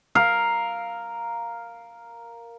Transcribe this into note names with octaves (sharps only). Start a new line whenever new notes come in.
A#4 F5